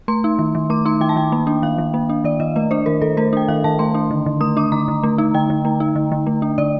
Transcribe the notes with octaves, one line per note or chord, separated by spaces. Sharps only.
A3 C6
D#4
D#3
D#3
A3 D6
D#4 C6
D#3 G5
A5
D#3 G5
A#3
D4
D#3 F5
D#3
A#3
D4
D#3 D5
D#3 D#5
A3 D#5
D4 C5
D#3 A#4
D#3 A4
A3 A#4
D4 G5
D#3 F5
D#3 A5
A3 C6
D4
D3
D3
A3 D#6
D4 D6
D3 A#5
D3
A3
D#4
D3 G5
D3
A3
D#4
D3
D3
A3
D4
D3 D5